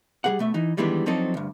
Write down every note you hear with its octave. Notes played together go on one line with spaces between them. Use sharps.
G3 G#4 F#5
B2 A3 E5
E3 D#4
D#3 E3 G3 G#3 B3 D4
F3 F#3 C4 D4 D#4 A4
D2 G2